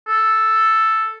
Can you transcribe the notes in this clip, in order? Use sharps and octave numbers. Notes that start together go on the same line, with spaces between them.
A4